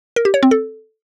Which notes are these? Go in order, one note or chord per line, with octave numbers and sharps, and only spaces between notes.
A#4
G4
C#5
C4
A4